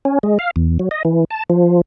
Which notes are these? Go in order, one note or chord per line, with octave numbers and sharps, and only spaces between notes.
C#4
G#3
F5
E2
F#3
D#5
E3
A5
F3